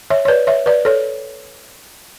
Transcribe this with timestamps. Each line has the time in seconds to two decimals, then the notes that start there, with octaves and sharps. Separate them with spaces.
0.10 C#5 E5
0.25 C#5
0.28 B4 D5
0.47 C#5 E5
0.66 B4 D5
0.85 A4 C#5